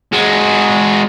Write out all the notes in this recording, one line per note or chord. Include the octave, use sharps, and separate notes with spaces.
G#3 F#4